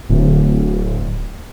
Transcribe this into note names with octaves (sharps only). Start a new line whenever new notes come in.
D1